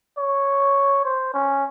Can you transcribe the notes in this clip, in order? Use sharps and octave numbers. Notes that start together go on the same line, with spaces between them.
C#5
C5
C#4